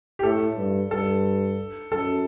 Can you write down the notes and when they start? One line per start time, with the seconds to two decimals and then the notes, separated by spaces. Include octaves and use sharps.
0.19 G4
0.23 A2 A4
0.57 G2
0.91 G2 A4
1.92 F#2 A4